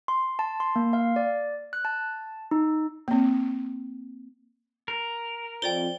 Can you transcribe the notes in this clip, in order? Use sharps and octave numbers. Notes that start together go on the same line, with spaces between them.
C6
A5
C6
A#3
F5
D5
F#6
A5
D#4
A#3 C4
A#4
F2 C5 D5 G5 G7